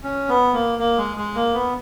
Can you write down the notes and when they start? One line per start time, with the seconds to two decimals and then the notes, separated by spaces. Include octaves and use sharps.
0.04 C#4
0.29 B3
0.53 A#3
0.79 A#3
0.98 G#3
1.17 G#3
1.35 A#3
1.54 B3